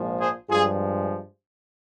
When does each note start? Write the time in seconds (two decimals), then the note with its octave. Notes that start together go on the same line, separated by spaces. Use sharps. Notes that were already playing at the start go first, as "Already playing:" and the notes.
Already playing: A#1 G#2 F3 G#3
0.20 G#4 C5
0.49 G2 F3 G#3 F4 G#4